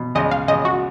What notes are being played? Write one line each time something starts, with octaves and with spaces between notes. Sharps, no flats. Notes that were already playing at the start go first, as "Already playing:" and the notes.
Already playing: B2
C#2 D#5
F5
C#2 D#5
F#4